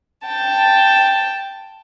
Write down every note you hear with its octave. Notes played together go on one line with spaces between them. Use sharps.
G5 A5